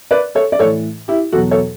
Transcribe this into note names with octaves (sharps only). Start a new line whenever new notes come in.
B4 D5
A4 C#5
D5
A2 E3 A4 C#5
E4 G4
E2 B2 F#3 F#4 A4
A4 C#5